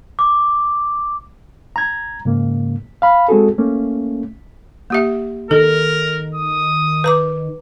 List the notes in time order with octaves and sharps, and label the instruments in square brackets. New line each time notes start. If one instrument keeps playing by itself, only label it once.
[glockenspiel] D6
[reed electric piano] A#5 G#6
G#2 C#3 A#3
F5 B5
G#3 C4 F#4 G#4 A4
A3 A#3 C#4
[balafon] A#3 G4 E5
[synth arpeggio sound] D#3 [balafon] A4 [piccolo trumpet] A#4
[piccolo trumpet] D#6
[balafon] B4 A#5 D6